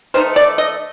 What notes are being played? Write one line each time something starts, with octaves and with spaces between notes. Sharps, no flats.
D#3 A3 D#4 C5
D5
D#5